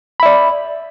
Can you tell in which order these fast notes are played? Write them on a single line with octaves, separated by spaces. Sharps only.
B5 E5 D5